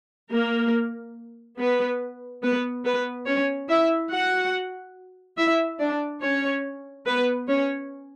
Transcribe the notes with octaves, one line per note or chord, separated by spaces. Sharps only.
A#3 A#4
B3 B4
B3 B4
B3 B4
C#4 C#5
E4 E5
F#4 F#5
E4 E5
D4 D5
C#4 C#5
B3 B4
C#4 C#5